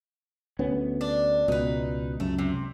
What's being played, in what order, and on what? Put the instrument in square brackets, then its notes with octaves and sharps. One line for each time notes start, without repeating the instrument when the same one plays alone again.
[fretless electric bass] D2 B3 C#4
[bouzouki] D4
[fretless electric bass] C#2 B2 [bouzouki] D#4 B4
[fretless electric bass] C#2 F#2 [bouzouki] A3
[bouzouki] C3